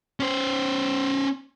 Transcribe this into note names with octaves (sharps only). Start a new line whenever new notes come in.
C#4 C5